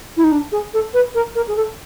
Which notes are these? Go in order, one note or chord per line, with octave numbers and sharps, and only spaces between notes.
E4
D#4
D4
G#4
A4
B4
A#4
A#4
G#4
A4